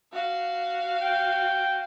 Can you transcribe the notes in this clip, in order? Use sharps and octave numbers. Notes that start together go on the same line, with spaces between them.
F#4 F5
G5